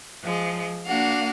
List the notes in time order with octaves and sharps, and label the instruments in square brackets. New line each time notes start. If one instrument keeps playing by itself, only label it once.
[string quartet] F3 G#3
A#3 D4 F#4 F5 F#5